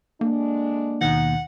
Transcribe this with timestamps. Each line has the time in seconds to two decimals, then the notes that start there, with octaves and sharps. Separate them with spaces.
0.21 D3 G#3 A#3 D4
1.01 D#2 B2 D#3 F#5